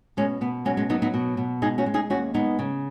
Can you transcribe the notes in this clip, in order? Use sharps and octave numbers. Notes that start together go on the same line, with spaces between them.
B2 G#3 C#4
B2 B3
F#3 G#3 C#4
G#3 C#4
F#3 B3 D#4
B3 D#4
B2
B2
G#3 D#4 G#4
C#4 F#4
G#3
D#4 G#4
D#2 C#4 F#4
G#3 B3 D#4
C#3